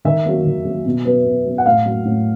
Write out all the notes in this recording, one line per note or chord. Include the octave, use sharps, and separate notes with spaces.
D#3 E5
F#3 A#3
D#3
F#3 A#3
B2
F#3 B3
B2
F#3 B3
F#5
A2 F5
F#3 A#3
A2